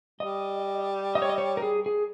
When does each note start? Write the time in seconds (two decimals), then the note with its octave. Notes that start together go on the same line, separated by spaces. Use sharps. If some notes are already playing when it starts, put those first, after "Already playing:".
0.20 G3 D#5
1.15 D#5
1.22 C#5
1.29 D#5
1.38 C#5
1.57 A#4
1.62 G#4
1.86 G#4